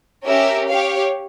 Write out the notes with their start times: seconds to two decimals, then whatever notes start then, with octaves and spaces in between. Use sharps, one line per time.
0.24 C#4 G4 A#4 E5
0.68 G4 C#5 F5